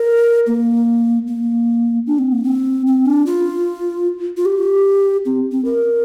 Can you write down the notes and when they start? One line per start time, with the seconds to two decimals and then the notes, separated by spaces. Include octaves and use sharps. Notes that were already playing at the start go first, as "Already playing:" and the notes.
Already playing: A#4
0.47 A#3
1.27 A#3
2.07 D4
2.18 C4
2.32 A#3
2.44 C4
2.87 C4
3.06 D4
3.26 F4
4.37 F4
4.45 G4
5.25 C4
5.52 C4
5.65 A#4